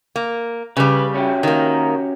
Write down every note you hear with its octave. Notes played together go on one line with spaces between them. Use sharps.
A#3
C#3 G3 B4
C#4 F#4 G4
D#3 A#3